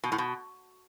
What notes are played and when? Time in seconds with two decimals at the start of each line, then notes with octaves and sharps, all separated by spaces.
0.04 B2
0.12 A2
0.18 B2